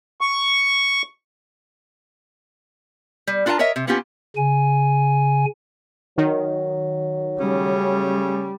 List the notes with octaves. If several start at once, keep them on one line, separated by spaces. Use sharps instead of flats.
C#6
G3
D4 F4 A#4 F#5 A5 A#5
A#4 C#5 D#5 E5
C3
A#3 B3 C#4 F4 G4
C#3 G#5
D#3 F#3
C#3 G3 A3 C#4